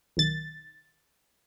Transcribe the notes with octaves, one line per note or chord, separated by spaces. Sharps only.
B1 D#3 A6